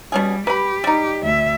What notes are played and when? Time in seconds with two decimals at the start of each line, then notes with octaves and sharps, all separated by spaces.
0.12 B2 G3 C#4 G#4
0.47 G4 B4 B5
0.84 G3 D#4
1.22 D2 E5